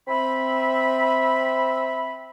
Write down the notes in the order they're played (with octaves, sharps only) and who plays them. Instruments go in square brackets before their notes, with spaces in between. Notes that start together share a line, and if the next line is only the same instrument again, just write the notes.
[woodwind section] C4 E5 B5